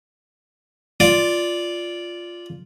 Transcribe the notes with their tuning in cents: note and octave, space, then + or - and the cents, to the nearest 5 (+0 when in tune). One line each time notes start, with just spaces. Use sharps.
F4 +0 D5 +0